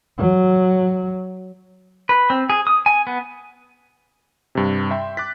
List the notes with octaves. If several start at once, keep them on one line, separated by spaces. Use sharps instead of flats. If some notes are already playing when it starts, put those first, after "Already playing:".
F#3
B4
C4
G#4
D#6
G#5
B3
G2 C3
E5 G5 C6
D6 F#6 A6 B6